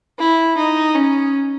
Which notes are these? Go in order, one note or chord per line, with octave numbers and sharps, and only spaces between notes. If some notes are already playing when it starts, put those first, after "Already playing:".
E4
D#4
C#4